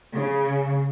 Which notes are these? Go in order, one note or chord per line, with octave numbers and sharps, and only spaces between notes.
C#3